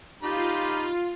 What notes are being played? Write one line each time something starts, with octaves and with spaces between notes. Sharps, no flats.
D#4 F4 G4 B5